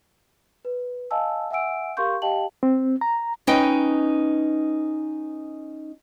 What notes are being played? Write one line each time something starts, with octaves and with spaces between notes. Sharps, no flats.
B4
D#5 F5 G#5 A5 E6
E5 F#5 G#5 E6 D7
G4 A#4 F5 C6 C#6 G6
G4 D#5 F5 G5 A5 F#7
C4
A#5
C#4 D#4 B4 D#5 G5